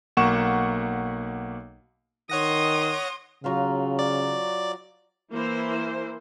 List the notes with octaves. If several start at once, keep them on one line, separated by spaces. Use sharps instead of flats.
B1 A#3 F#5 C#6 E7
D#3 C#5 F#5 C6 D#6 A#6
C#3 F#3 F4 F5
D5
E3 A#3 E4 C5